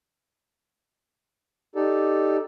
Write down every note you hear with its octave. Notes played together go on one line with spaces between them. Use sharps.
D#4 G4 A4 D5